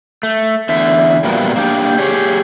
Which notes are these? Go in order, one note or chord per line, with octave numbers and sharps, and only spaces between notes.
A3
E2 D3 E5
A#2 F3 G3 B3 F#4 A#4
A#3 D4 G4
G4 G#4 C#5